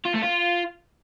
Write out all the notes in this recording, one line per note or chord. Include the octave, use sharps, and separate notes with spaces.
F4
A3
F4